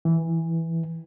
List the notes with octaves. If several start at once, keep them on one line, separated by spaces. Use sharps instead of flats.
E3